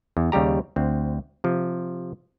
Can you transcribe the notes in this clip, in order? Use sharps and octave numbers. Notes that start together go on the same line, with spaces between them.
E2
D#2 C#3 G3 G4 A#5
D2 C4
C3 F3